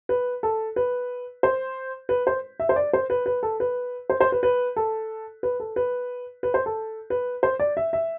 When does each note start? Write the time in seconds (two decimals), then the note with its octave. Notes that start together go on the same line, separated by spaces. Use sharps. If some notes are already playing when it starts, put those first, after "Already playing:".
0.09 B4
0.43 A4
0.76 B4
1.43 C5
2.09 B4
2.27 C5
2.60 E5
2.69 C5
2.76 D5
2.93 C5
3.10 B4
3.26 B4
3.43 A4
3.60 B4
4.10 C5
4.21 C5
4.32 B4
4.43 B4
4.76 A4
5.43 B4
5.60 A4
5.76 B4
6.43 B4
6.54 C5
6.66 A4
7.10 B4
7.43 C5
7.60 D5
7.77 E5
7.93 E5